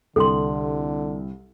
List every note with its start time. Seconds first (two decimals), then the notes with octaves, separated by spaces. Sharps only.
0.16 C2 D3 A4 G5 C6